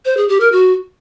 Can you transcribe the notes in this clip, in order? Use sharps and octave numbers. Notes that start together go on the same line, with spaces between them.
C5
G#4
G4
A#4
F#4